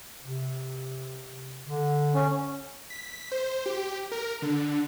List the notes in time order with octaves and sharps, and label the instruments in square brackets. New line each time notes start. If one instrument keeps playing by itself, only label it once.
[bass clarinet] C3
D3
[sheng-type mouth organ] C#4
[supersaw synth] B6
C5
G4
A#4
D3